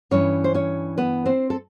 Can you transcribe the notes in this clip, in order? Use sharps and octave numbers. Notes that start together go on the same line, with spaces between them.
G2 E3 C#4 C#5
C5
C#4 C#5
B3 B4
C4 C5
A4